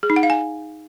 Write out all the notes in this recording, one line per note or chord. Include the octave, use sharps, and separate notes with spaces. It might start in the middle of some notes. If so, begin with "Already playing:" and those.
G#4
D#4
F#5
F5
G#5